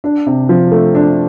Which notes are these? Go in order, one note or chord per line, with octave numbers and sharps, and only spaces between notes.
D4
C3
F3
A3
D4